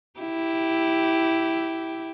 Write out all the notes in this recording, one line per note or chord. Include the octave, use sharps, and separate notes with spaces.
E4 G4